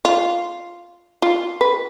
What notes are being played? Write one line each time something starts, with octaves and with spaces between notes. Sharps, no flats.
F4
F4
B4